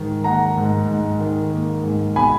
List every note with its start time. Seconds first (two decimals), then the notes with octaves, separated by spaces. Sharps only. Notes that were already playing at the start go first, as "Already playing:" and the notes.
Already playing: G#2 D#3
0.24 A#3 F#5 A#5
0.57 G#2
0.88 G#2
1.20 D#3
1.52 A#3
1.83 G#2
2.15 B2 G#5 B5